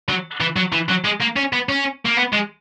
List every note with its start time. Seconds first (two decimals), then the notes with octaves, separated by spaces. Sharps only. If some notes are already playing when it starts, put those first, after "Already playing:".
0.09 F#3
0.41 E3
0.56 F#3
0.72 E3
0.89 F#3
1.04 G#3
1.20 A#3
1.36 C#4
1.53 B3
1.69 C#4
2.06 A#3
2.17 B3
2.33 G#3